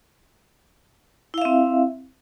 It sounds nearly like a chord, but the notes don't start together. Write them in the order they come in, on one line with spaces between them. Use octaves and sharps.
E4 F5 E5 C4